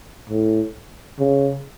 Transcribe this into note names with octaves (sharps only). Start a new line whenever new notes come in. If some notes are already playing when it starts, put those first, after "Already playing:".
A2
C#3